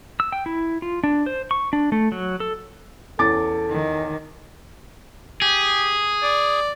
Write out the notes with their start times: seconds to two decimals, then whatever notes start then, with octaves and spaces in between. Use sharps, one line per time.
0.20 E6
0.32 G5
0.46 E4
0.82 F4
1.04 D4
1.26 C5
1.51 C#6
1.73 D4
1.92 A3
2.12 F#3
2.40 A4
3.19 E2 C#4 A4 D6 A6
3.70 D#3
5.42 G4 G#4
6.23 D5